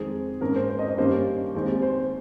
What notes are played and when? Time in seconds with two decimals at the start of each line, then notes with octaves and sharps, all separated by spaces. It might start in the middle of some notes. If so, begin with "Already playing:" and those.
Already playing: F2 D#3 G#3 C4 G#4
0.41 G#2 D#3 A#3 C#4 A#4
0.56 C5
0.69 C5
0.79 D#5
0.89 D#5
0.98 G2 D#3 A#3 C#4 C5
1.55 D#2 D#3 G#3 C4
1.82 C5